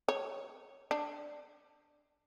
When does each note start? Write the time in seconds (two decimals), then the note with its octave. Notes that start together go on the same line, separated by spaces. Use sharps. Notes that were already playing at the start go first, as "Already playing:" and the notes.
0.08 C#5
0.91 D4